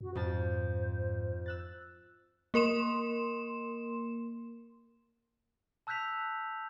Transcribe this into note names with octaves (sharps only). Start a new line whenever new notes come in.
F#2 F#4
F2 G#2 C5 A5
E6 F#6 A6
A#3 A#4 C6 E7
A5 E6 F#6 G6 B6 F7